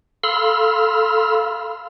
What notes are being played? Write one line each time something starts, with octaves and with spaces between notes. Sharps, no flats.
A4 F5 B5 C6 E6 F6